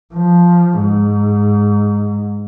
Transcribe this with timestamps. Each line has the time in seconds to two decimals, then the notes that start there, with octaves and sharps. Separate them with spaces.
0.14 F3
0.81 G#2